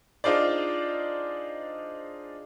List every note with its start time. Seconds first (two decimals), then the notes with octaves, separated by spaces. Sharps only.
0.24 D4 D#4 F4 G#4 C5 D5